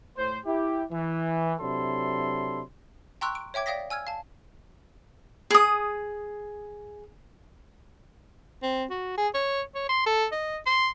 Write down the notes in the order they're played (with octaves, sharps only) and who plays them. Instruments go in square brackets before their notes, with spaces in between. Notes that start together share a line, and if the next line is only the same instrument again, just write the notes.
[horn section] A2 C5
E4 G4
E3
C3 F#3 D4 E4 A4 C6
[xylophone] G5 A#5 C6 C#6 E6 F#6
D7
C#5 E5 G5 D6 G#6
D5 F5 G5 D#6 A#6 B6
G#5 E6 F6 G#6
F5 A5
[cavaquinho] G#4 D#6
[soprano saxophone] C4
F#4
G#4
C#5
C#5
C6
A4
D#5
C6